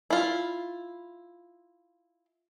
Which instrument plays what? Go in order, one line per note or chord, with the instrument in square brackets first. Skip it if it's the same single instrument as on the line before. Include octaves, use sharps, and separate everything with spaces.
[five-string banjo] E4 F4